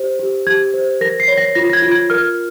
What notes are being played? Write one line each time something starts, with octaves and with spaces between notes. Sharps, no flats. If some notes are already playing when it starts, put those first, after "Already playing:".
Already playing: G4 C5
G4
G4 G#6
C5
A#4 A#6
C7
C#5
A#6
F4 A#6
A#6
G#6
F4
G#6
A#4 F6